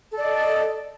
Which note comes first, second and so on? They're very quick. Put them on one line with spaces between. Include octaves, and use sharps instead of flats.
A4 D5 D#5